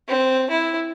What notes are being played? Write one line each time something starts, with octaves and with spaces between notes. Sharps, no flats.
C4
E4